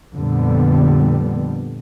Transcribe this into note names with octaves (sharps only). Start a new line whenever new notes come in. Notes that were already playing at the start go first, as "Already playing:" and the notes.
F2 A#2 D3 G3 B3